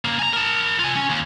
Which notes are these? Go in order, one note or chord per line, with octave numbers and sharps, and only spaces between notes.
C#3 A#3
G#5 A#5
A#4 A5
F4 G#5
C#4
D#2